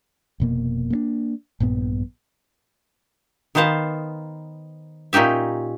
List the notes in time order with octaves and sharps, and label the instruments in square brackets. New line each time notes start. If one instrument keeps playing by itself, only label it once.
[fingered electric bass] F1 B2 A#3
A#3 B3 D4
A#1 G2 A#2 B3
[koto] D#3 B3 C5 F5 A5
A#2 C#4 D#4 G4 E5